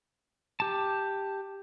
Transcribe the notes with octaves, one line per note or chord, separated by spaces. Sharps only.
G4 A5